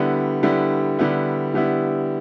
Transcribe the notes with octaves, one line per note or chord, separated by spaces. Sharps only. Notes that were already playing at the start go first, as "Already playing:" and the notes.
Already playing: D3 G3 B3 E4
D3 G3 B3 E4
D3 G3 B3 E4
D3 G3 B3 E4